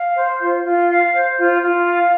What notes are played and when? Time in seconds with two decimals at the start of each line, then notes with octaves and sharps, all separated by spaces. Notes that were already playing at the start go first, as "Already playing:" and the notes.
Already playing: F5
0.15 C5
0.40 F4
0.65 F4
0.89 F5
1.14 C5
1.38 F4
1.62 F4
1.86 F5